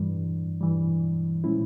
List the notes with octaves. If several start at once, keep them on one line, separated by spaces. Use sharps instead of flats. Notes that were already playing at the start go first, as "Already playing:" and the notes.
Already playing: G2 E3 G3
G2 E3 G3
A#2 F3 G#3 C#4 E4